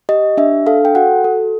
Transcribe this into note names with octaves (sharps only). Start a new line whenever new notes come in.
G4 D#5
D4 E5
A4 F5
G5
F#4 F#5
A4